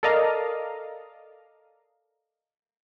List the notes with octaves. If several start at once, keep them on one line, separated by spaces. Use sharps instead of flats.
A4 A#4 D5 D#5 F5 A#5